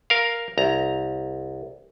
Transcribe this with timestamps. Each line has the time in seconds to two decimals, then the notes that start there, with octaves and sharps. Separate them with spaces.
0.10 A#4 F5
0.58 C2 A#5